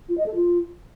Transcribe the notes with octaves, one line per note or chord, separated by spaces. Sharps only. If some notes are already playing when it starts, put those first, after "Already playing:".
F4
D#5
A4
F4